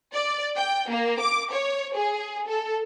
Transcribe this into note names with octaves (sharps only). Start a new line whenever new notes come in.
D5
G5
A#3
D6
C#5
G#4
A4